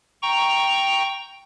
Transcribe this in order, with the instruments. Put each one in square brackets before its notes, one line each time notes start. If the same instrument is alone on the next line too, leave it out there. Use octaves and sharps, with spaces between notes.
[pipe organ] G5 A#5 C#6